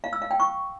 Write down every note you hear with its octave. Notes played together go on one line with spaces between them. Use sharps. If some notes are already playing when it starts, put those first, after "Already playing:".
F5
E6
F5
G5
C#6